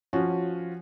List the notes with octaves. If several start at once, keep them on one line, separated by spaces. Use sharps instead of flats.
F3 C#4 F#4